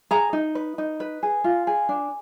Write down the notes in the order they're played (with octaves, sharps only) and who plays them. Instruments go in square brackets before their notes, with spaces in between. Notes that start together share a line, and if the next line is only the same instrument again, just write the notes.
[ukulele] G#4 A#5
D#4
B4
D#4
B4
G#4
F4
G#4
D4